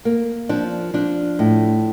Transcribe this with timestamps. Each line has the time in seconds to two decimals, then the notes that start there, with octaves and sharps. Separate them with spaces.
0.05 A#3
0.49 F3 D4
0.94 F3 D4
1.39 A2